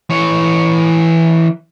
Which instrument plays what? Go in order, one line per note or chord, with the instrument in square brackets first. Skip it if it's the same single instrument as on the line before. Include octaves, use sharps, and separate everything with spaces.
[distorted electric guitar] E3 C#5